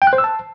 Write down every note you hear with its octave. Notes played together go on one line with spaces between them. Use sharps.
G5
F#6
C5
E6
A5